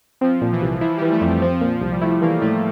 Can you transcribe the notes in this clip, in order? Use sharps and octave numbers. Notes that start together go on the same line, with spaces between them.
F3 C4
A#2
E3
C2
F3 E4
G3
E3
A3
F2 G3
G3
F3 C4
A#2
C2
G3
A3 E4
E3 A#3
A2 A3